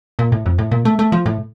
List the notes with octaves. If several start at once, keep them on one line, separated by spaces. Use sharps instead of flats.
A#2
A2
F2
A2
A#2
A3
A3
F3
A2